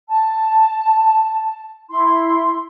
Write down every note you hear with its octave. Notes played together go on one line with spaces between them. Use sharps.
A5
E4 C6